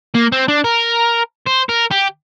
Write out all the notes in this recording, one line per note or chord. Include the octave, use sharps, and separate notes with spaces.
A#3
C4
D4
A#4
C5
A#4
G4